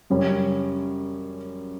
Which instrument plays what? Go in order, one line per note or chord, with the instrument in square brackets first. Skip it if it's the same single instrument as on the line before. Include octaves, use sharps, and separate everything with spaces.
[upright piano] F#2 C#3 G3 C#4